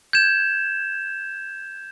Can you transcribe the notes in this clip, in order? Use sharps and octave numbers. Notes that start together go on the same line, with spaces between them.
G6 G#6 E7